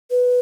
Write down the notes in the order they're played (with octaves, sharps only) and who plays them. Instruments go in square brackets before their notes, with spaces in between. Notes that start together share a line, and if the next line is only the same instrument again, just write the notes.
[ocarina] B4